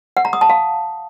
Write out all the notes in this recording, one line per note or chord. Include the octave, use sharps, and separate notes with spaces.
F#5
A#5
D#6
A5
F5